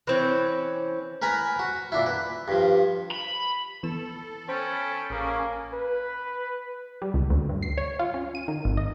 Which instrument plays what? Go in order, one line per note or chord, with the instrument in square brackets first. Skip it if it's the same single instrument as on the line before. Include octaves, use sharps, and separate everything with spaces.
[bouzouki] E3 C4 C#4
[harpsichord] A#4 B4 G#5 A#5 B5
F#4
A#2 D4 E4
B4
G2 F3
[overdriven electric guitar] B5
[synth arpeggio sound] E3 B3 E7 [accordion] A4
[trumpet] C#4 [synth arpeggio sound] C5 [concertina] G5 A5 B5
[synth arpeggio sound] A1 [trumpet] A#3 [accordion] C#4 [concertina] G#4
[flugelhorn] B4
[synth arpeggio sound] G3
C#2
D2
G2
C7
C#5
F4
C#4
D#7
D#3
G#1
D#5